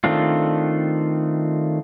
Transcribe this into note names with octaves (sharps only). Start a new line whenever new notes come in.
D#3 A3 C4 D4 F4